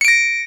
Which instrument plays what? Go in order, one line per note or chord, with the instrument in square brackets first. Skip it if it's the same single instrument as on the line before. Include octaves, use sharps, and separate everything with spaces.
[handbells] C#7
D7
A#6